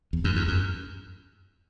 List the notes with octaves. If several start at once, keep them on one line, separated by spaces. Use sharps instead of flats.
E2
F#2
E2
F#2